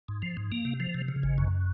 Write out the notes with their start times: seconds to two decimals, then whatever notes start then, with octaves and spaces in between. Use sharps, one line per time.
0.08 G#2
0.22 F3
0.37 G#2
0.52 A#3
0.65 C3
0.80 F3
0.94 C3
1.08 C#3
1.23 G#1
1.38 F#2